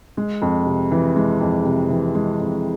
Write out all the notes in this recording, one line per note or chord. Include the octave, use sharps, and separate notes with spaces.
G#3
F2
C3
E3
G#3
F2
C3
E3
G#3
F2